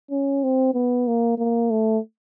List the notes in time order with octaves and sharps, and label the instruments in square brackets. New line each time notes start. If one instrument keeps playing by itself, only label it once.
[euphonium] C#4
C4
B3
A#3
A#3
A3